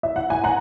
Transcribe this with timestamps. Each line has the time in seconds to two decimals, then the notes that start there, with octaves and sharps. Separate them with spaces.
0.03 E5
0.16 F#5
0.30 G#5
0.44 F#5 A#5